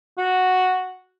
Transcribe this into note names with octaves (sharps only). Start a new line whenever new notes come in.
F#4